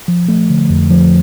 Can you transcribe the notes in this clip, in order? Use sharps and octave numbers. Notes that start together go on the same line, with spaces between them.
F3
A3
D3
F2
F3